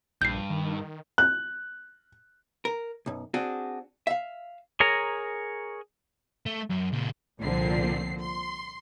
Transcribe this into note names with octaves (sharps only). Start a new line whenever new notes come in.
A#1 G2 G6 C7
D#3
F#6
A#4
B1 F#2
C4 D4 F#4 G#4
E5 F5
G#4 A#4 C#5 A#5
A3
F#2
C#2 A#2
C2 A#2 D3 F3 C4 C7
C6